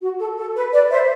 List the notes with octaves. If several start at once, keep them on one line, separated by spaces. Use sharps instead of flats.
F#4
A4
A4
B4
B4 D5
C5 E5